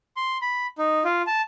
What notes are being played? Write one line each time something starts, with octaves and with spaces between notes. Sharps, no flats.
C6
B5
D#4
F4
A5